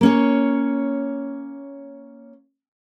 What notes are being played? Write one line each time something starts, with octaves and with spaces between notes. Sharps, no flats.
A#3 C#4 C#5